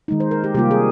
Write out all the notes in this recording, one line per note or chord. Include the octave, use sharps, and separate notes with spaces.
D#3 G#3 D#4
C5
A#4
G4
C3 G3 A#3 F4 G4
G#4